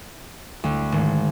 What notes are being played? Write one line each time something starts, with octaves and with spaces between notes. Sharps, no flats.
D2
G#1